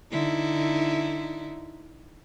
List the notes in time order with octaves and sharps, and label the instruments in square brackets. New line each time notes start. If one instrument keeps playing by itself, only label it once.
[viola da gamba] D3 D#4 E4